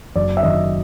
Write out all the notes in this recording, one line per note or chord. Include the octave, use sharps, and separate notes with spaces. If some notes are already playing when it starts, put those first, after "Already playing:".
F#1 D5
E5
F#2 D#3 F#3 D#5